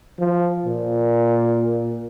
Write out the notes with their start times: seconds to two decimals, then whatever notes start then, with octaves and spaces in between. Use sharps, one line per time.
0.19 F3
0.66 A#2